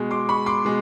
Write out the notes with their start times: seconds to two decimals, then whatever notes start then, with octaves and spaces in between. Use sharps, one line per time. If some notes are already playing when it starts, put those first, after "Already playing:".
Already playing: B2 G#3
0.11 C6 D6
0.29 B5 C#6
0.46 C6 D6
0.65 B2 G#3